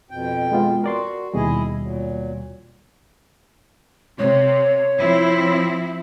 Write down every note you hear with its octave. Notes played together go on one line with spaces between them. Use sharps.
F2 B2 G5
G#3 B3 F4
F#4 A#4 D5 C6
D#2 B2 G3 E4 G#4 D#5
A#2 F#3
C3 C#5
F3 C4 E4